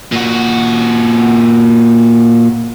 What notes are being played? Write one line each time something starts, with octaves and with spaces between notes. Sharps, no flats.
A#2 F#4